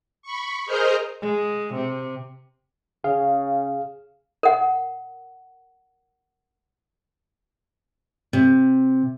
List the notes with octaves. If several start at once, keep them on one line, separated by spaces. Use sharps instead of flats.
B5 C#6
G#4 A#4 C5 D#5 F6 G6
G#3
C3
C#3 G#4 F5
A#4 F#5
C3